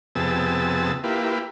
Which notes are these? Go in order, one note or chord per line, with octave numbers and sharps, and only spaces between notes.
F2 C3 B3 G#4 A5 E6
A#3 E4 F4 G4 B4